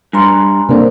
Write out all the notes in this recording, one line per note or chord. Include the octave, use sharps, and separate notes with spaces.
G2 G#5 A#5 C6
C3 A#3 D4 A4 A#4 C5